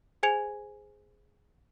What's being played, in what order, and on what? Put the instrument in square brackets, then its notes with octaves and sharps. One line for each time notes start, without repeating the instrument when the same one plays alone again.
[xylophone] G#4 C5 G#5 G#6 C#7 F7